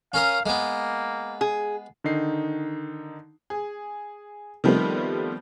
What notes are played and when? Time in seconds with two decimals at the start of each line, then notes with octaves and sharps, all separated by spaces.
0.14 C#4 A#4 F5 D#6
0.46 G#3 A#3 B3
1.41 G#4
2.04 D3 D#3 D#4 C7
3.50 G#4
4.64 D#3 F3 G3 A3 B3 C4